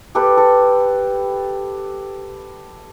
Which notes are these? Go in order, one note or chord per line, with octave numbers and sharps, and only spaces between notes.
G4 A4 B4
A4